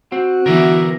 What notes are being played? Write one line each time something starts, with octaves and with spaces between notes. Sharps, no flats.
C4 F#4
D3 E3 B3 A#4 D5 E5